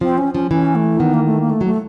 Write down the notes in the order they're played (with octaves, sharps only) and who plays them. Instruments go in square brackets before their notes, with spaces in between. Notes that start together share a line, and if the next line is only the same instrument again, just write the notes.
[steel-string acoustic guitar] F3 [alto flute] C4
[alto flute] C#4
[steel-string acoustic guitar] F3 [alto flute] C#4
[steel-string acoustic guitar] E3 [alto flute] C#4
[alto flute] A3
[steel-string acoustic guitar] D#3 [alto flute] B3
[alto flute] A#3
A3
A#3
A3
[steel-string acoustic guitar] F#3
[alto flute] A3